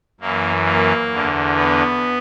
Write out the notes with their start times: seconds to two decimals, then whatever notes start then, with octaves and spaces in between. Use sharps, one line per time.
0.21 F#2 E3 A#3
0.65 A#3
1.11 E2 D3
1.55 B3